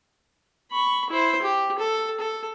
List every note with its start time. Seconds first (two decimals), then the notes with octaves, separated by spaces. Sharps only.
0.71 B5 C#6
1.10 E4 C5
1.42 G4
1.79 A4
2.20 A4